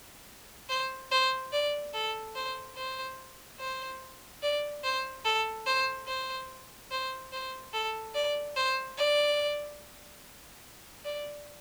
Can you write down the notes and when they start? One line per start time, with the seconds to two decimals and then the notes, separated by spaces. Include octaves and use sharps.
0.69 C5
1.11 C5
1.52 D5
1.94 A4
2.35 C5
2.76 C5
3.59 C5
4.42 D5
4.84 C5
5.25 A4
5.66 C5
6.08 C5
6.91 C5
7.32 C5
7.74 A4
8.15 D5
8.56 C5
8.98 D5
11.05 D5